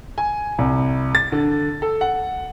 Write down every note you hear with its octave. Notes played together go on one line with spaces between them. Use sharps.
G#5
C2
A6
D3
A4
F#5